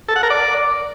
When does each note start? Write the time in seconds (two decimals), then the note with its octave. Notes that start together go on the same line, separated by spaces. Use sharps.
0.08 A4
0.16 F#5
0.23 A#4
0.30 D5